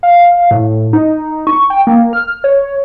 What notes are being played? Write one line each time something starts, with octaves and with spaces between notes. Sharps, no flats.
F5
A2
D#4
C#6
G5
A#3
F6
C#5